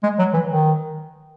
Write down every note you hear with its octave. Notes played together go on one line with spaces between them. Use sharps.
G#3
F#3
E3
D#3